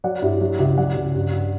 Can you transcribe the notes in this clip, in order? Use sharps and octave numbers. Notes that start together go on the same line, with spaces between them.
F#3 D5 F#5
G2 E4 G4
F#3 E4 G4
C#2 E4 G4
F#3 D5 F#5
C#2
G2
G2